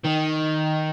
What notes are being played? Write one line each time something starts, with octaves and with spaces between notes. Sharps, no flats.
D#3